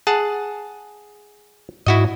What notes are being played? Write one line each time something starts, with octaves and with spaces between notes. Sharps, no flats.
G#4 F#5 A5
G#2 E4 F#4 D#5